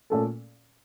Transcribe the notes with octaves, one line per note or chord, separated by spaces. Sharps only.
A#2 A3 C#4 A4